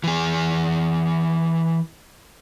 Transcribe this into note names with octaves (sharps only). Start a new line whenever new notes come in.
E3 G#4